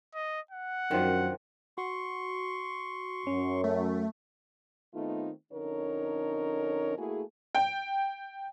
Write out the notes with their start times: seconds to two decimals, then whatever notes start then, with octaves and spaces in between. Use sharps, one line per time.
0.14 D#5
0.51 F#5
0.91 F#2 D#3 F3 D4
1.78 F#4 C6 C#6
3.27 F#2 C#4
3.64 A3
4.94 D#3 A3 B3 C4 D#4 F4
5.52 F2 D3 C#4 D#4 A#4 C#5
6.98 A3 A#3 E4 F#4 G#4
7.55 G5